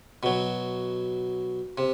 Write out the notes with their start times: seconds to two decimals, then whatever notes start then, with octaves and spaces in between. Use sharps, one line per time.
0.23 B2 F#3
1.78 C3